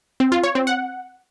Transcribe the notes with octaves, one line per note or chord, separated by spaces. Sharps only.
C4
F4
C#5
C4
F#5